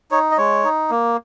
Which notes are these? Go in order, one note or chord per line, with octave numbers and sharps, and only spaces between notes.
D#4 C#5
D#5
G#3 C#5
D#4
A#3